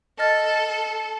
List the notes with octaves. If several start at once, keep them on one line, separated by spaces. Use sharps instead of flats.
A4 D#5 F6 A6